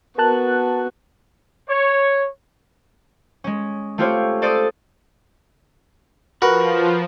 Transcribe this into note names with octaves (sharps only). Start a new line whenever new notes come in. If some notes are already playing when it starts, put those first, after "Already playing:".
B3 F#4 A#4 A5 F#6
C#5
G#3 C#4
A3 C4 F4 G4 C5 C#5
A4 C5 D5 C6 D#6 A6
F3 F#4 A#4 B4